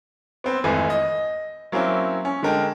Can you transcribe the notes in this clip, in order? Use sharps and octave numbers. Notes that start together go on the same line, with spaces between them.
B3 C4 B4
G#1 F2 E3 A3 B4 G#5
D#5
F#3 A#3 C4 C#4 E4
C#4
D3 G#3 A#4 G5 A5